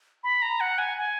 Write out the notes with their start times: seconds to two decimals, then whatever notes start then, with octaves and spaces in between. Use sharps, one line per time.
0.23 B5
0.42 A#5
0.60 F#5
0.78 G#5
0.97 G#5